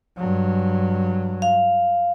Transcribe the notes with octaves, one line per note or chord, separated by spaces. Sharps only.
G2 F#3
F5